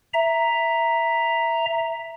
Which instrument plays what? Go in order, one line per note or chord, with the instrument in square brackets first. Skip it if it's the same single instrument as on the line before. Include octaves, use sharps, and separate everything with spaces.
[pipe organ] E5 A#5